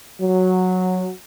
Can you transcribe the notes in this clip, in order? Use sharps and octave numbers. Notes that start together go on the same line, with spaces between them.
F#3